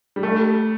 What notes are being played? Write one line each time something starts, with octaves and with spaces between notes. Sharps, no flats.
G3
A3